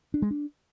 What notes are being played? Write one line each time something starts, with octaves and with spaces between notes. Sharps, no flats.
D4
G#3
D4